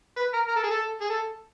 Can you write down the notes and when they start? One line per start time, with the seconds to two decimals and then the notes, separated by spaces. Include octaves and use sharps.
0.17 B4
0.33 A#4
0.48 A#4
0.56 A4
0.63 G#4
0.71 A4
1.01 G#4
1.10 A4